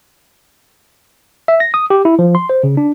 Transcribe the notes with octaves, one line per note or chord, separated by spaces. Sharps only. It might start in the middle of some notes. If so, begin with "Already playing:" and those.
E5
A#6
D#6
G4
E4
F3
C6
C5
C#3
D4